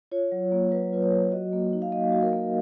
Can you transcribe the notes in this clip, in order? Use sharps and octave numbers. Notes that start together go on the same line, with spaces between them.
F4 C#5
F#3
A#3
F#3 B4
F4 B4
C#5
F#3
F#4 D#5
A#3
D#4
F5
A#3 D#5
F#4
A#4
A#3